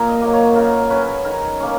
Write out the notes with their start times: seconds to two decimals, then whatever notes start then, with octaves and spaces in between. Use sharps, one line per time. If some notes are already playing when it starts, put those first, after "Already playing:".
Already playing: A#2 G#5 A#5
0.09 D#5
0.22 F#3 A#3
0.33 C#5
0.56 C#3 A#4
0.90 C#4 B4
0.96 F#3
1.25 D#3 A#4
1.60 A#3 C#4